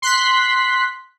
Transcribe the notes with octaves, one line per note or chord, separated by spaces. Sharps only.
C6 F#6 B6